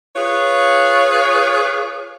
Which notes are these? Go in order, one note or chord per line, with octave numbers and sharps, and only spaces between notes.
F4 G#4 B4 C#5